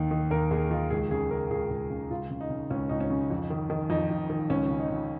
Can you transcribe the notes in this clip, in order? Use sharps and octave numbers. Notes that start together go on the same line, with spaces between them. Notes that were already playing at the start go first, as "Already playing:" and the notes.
Already playing: D#2 D#3
D#3
D#2 A#4
D#2 G#4
D#3 F4
C#2 G#4
C#3 G#4
C#3 A#4
C#2 G#4
C#2
C#3
C#2 F4
C#3
D#4
C#3
C#2 C#4
C#2 D#4
C#4
C#3
F2
D#3
D#3
F2 D#4
F2
D#3
C#2 C#4
C#3
D#4
C#3